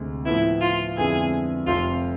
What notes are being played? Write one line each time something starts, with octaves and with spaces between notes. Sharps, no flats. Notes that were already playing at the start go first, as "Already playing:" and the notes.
Already playing: D2 C3 G#3
A2 F3 B3 E4
F4
F2 D3 G#3 B3 E4 G#4
F1 F2 C3 F4